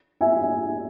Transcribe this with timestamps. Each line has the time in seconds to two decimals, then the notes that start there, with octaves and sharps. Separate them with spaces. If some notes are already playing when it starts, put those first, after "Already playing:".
0.21 E5 G#5